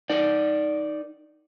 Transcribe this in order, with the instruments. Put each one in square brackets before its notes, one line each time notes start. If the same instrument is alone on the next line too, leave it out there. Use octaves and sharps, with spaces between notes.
[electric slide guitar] D#4 A#4 D5